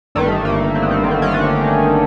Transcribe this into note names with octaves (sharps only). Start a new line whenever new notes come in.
G1 G2 D#3 A3
A#3
C4
B3
C4
G1 G2 D#3
C4
C#4
D4
D#4